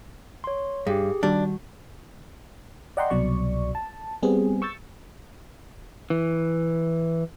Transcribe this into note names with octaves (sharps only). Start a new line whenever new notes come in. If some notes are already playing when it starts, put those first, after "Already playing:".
C#5 C6
G2 G4 G#4
D#3 G3 D4 F#4
D5 D#5 F#5 G5 A#5 C6
C2 B2 F#3 D5 C#6
A5
G3 B3 C4 G#4
C#6 E6 G6 A6
E3